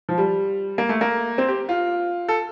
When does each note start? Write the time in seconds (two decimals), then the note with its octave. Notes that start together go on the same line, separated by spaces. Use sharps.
0.09 F3
0.18 G3
0.78 A#3
0.89 A3
1.01 A#3
1.38 C4
1.48 G4
1.69 F4
2.28 A4